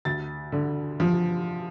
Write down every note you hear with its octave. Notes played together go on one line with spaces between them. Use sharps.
D2 A6
D3
F3